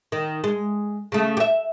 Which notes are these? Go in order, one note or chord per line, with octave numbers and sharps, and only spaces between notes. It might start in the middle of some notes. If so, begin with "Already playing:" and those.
D#3
G#3
C#3 A3
G4 E5